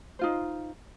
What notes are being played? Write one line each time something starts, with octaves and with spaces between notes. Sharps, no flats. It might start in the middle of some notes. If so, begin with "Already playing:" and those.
D#4 F4 C5